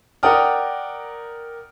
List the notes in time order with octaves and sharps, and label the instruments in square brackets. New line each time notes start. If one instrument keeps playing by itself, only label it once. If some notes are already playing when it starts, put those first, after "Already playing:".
[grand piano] A#4 D5 F#5 G5 D#6 F6